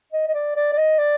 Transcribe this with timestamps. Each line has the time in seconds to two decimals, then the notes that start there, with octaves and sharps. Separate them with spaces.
0.13 D#5
0.28 D#5
0.34 D5
0.56 D5
0.72 D5
0.77 D#5
0.99 D5